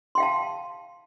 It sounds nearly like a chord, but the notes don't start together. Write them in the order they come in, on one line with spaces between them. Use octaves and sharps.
C6 G5 F5 A5